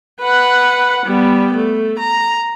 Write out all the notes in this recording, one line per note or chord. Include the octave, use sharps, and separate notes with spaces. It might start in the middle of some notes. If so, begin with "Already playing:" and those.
B4 F#5
G3 B3
A3
A#5